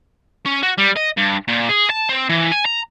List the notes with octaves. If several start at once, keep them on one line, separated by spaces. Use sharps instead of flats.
C#4
F#4
G3
D#5
G2
A#2
G#4
A5
C4
E3
G#5
A#5